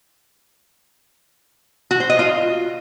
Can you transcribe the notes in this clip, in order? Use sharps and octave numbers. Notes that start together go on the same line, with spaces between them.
F#4
C5
D#5
F4